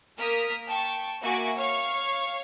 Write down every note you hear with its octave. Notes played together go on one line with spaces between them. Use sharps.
A#3 A#4 D#6 F6 B6
G5 A5 C#6
A#3 F#4 E5 G#5 D6 D7
C#5 F5 C#6 F6